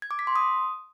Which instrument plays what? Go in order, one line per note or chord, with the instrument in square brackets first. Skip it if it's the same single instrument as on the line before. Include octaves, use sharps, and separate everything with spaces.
[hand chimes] G#6
D6
B6
C6
D#6